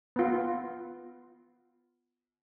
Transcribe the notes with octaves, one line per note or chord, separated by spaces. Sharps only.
B3 F4